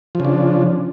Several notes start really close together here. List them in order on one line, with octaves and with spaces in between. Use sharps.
F3 C#3 D4